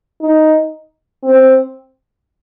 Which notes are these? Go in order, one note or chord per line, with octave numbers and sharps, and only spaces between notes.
D#4
C4